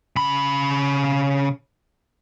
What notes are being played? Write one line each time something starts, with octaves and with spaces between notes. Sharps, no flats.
C#3 B5